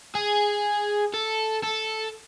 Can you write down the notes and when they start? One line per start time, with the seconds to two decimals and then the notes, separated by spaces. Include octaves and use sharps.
0.15 G#4
1.14 A4
1.63 A4